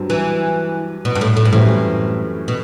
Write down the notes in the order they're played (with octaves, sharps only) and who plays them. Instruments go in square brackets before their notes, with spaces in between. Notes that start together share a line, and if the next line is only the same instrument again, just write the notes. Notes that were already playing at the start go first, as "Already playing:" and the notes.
Already playing: [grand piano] G2 F#3 C4
[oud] E3
B2
G2
A2
A2
G2
[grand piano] F#2 E3 G3 C4 E4 [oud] A2
[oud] B2